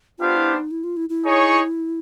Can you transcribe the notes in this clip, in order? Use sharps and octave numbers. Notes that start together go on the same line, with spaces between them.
B3 D4 F4 G4 C5 F5
E4
D#4
E4
F4
E4
E4
D#4 G#4 C#5